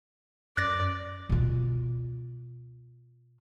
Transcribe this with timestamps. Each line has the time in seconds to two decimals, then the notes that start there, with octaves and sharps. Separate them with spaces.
0.57 F#2 D5 F#6 A6 A#6
1.29 B2 F4